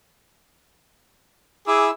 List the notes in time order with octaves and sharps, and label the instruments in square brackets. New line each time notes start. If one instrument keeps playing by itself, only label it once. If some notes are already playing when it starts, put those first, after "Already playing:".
[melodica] E4 E6 [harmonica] G#4 D6